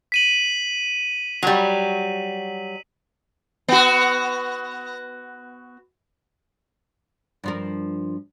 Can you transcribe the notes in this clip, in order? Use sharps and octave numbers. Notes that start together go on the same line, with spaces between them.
B6 D#7 F#7
F#3 G3
B3 F#4
G2 F3 A#4